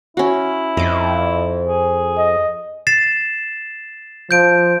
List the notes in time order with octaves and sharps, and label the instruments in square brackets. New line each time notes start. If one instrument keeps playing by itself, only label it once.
[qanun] C#4 F#4 [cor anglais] E4
[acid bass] F2 [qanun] D#5 D6
[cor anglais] G#4
[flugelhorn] D#5
[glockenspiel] A6 C7 E7
[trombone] F3 [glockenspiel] G6 D7